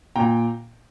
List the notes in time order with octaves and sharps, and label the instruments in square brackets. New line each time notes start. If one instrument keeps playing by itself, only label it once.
[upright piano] A#2 G5 A#5